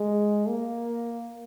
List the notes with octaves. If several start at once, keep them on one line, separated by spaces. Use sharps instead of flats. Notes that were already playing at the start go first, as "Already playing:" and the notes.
Already playing: G#3
A#3